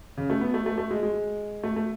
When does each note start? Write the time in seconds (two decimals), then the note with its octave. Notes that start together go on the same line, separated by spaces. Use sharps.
0.17 C#3
0.30 A3
0.41 B3
0.54 A3
0.66 A3
0.78 A3
0.91 G#3
1.03 G#3
1.63 A3
1.76 A3